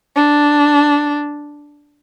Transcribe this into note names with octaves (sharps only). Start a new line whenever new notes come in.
D4